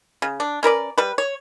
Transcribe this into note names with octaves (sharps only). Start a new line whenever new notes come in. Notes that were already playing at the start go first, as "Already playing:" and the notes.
C#3
D4
C#4 A#4 B4 D5
G3 B4
C#5